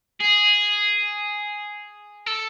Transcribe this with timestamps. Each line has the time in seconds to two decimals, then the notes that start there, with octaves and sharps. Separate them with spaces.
0.21 G#4
2.27 A4